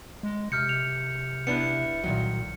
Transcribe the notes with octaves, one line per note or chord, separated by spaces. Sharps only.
G#3
C3 F6 G6 C#7
F7
B3 D4 E4 C#7
C2 A#2 D#3 F#3